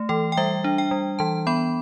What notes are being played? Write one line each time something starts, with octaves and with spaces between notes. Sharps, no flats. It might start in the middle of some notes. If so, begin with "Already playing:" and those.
Already playing: A3
E3 A4
G5
G3 E5
D4
G5
G3
E3 A5
B3 B5